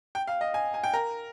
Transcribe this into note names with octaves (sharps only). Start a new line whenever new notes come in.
G5
F5
D#5
G#5
G#5
G5
A#4